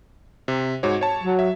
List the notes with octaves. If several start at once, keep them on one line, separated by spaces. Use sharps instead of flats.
C3
G#2 F#4 C#5
C#5 A5
F#3
E5